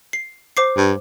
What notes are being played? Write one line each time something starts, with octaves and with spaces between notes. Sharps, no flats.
C7
C5 D6 C7
G2